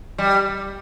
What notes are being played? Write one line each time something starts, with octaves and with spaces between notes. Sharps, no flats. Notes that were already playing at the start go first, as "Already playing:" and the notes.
G3